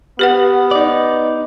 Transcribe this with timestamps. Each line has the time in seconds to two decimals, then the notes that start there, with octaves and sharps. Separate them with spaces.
0.19 B3 G4 B4 F#5
0.71 D#4 D5